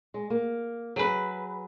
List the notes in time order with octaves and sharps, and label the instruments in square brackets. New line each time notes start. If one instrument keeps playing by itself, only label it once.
[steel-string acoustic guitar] G#3
A#3
[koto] F#3 B4 [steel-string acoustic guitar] G#4